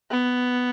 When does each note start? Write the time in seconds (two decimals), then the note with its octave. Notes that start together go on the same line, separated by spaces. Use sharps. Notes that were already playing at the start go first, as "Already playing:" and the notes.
0.11 B3